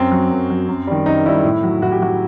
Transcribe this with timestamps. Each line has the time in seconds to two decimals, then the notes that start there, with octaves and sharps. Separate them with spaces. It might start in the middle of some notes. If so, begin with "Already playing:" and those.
Already playing: F#2 C4
0.12 F#3
0.30 F#2
0.50 F#3
0.68 F#2
0.87 D#3 G3
1.06 F#2 D#4
1.26 D#3 G3 E4
1.44 A2
1.63 F#3
1.82 A2 F#4
1.92 G4
2.00 F#3 F#4